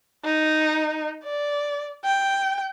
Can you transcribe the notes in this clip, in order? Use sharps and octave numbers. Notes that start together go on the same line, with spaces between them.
D#4
D5
G5